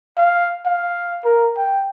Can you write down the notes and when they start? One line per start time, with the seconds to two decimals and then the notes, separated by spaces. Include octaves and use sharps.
0.18 F5
0.66 F5
1.24 A#4
1.57 G5